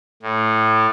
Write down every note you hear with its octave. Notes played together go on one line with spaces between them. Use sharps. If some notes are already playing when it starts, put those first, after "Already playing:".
A2